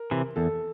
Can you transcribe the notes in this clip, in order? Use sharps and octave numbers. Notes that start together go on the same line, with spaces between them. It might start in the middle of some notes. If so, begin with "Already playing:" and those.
Already playing: A#4
C3 E3
E2 A4